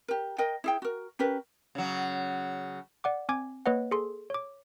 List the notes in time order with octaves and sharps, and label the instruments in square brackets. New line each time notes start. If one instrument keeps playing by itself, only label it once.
[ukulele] G4 A#4
A#4 D#5 G5
E4 G#4 G5
F#4 A#4
C#4 G4 A#4 B4
[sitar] C#3 F#3
[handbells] D5 F#5 D6
C4 G#5 D6 G#6
A#3 B4 C#5 D#5 F#5
G#4 A4 C6
C#5 D6